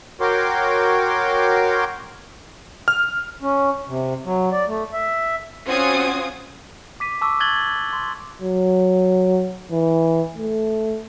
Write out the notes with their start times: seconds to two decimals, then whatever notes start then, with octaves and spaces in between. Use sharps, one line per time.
0.21 F#4 A#4 C#5 G5 C6 D6
2.88 F6
3.42 C#4
3.88 C3
4.25 F#3
4.52 D5
4.67 A3
4.93 E5
5.66 C4 C#4 F4 F#4 D#6 G#6
7.00 D6 B6 D#7
7.21 A5 C#6 D6 E6
7.40 F#6 G#6 A6 F#7 G7
7.93 C6
8.41 F#3
9.72 E3
10.37 A3